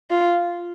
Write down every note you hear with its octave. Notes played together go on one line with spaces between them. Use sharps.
F4